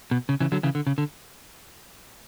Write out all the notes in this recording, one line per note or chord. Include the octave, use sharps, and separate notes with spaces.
B2
C#3
C#3 E3
D3 F#3
C#3 E3
D3
C#3
D3